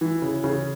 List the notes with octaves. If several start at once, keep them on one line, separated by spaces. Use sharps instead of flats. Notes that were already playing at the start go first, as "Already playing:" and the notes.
E3
C#3
C#3